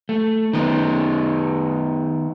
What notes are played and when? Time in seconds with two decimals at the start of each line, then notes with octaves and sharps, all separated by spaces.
0.09 A3
0.53 D#3 B3 D#4